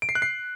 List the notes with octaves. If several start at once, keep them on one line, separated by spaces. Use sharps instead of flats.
D7
C7
F#6
C7